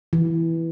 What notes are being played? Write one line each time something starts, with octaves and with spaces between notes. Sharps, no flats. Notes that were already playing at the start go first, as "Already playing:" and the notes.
E3